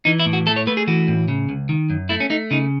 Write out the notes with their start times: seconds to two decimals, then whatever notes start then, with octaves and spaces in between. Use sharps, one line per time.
0.05 E3 D#4
0.20 E4
0.26 A2
0.33 F#4
0.47 A3 A4
0.56 C#5
0.67 A3 B4
0.77 G#4
0.88 E3 F#4
1.08 A2
1.28 C#3
1.49 C#2
1.69 D#3
1.90 F#2
2.09 A3 E4
2.20 C#4
2.30 A3 D#4
2.51 C#3 D#4